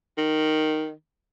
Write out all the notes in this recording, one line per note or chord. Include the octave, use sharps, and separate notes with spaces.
D#3